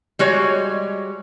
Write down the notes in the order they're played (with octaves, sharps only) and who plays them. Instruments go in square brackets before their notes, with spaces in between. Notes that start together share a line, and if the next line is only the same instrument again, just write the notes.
[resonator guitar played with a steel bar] G3 G#3 F#4 C#5